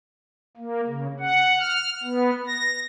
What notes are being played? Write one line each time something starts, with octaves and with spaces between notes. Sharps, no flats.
A#3
C#3
F#5
F6
B3
A#6